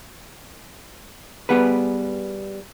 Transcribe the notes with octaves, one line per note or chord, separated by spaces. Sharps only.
G3 B3 G#4 B4